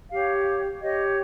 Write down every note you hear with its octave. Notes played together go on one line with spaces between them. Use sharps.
G4 C#5 F5
G4 C#5 D#5